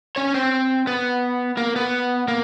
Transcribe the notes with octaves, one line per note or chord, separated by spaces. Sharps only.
C#4 C#5
C4 C5
B3 B4
A#3 A#4
B3 B4
A#3 A#4